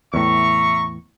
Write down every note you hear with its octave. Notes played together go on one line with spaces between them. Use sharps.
E2 A2 E5 A#5 C#6